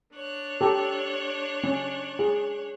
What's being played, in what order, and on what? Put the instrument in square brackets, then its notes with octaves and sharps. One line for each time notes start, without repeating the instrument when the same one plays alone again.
[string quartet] D4 C#5 F#6
[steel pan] G4 A4
C#4
G#4